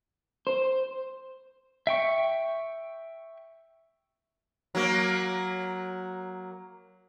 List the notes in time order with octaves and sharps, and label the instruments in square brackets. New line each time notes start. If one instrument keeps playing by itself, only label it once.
[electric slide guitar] C5
[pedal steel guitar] E5 G5 C#6
[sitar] F#3 A#3